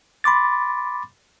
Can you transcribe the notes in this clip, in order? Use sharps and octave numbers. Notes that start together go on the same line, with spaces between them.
B5 C6 D6 A6